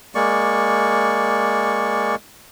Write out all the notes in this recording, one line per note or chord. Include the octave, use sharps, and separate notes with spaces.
G#3 A#3 D5 C#6